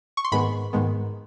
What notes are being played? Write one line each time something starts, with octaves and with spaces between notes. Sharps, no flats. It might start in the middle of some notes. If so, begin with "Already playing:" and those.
C#6
C6
G#2 D#3 G#3 B3 B5
G#2 D#3 G#3 B3